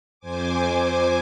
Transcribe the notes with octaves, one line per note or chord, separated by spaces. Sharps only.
F2 C5 G#5 D6